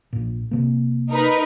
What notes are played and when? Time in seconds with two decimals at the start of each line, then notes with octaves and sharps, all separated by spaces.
0.13 A#1 A#2
0.51 C3 A#3
1.09 D#4 A#4 B4